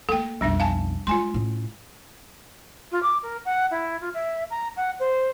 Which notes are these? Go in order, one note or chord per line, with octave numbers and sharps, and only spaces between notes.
A#3 B3 A4 G5
B1 F2 G3 D4 E5
F5 G#5 A5
G#3 D4 F4 G#5 C6
A2 C#4
F4
D6
A#4
F#5
E4
F4
E5
A#5
F#5
C5